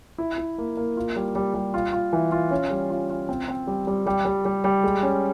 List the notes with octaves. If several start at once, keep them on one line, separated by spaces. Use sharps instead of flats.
E4
E4
A#3
A#3
F4
G3
G3
G3
F4
F4
E3
F4
C#4
G3
F4
F4
C4
C4
G3
G3
G3
G3
G3
G3
G#3
C#4